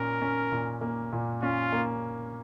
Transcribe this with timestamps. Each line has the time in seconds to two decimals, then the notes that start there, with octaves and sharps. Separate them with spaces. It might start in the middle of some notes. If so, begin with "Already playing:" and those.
Already playing: A#2 C#4 A#4
0.22 C#4
0.52 A#2
0.81 A#3
1.12 A#2
1.42 C#4 F4
1.72 A#3